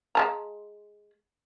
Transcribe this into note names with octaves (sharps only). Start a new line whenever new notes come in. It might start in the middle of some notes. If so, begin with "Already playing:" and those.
G#3 A5 A#5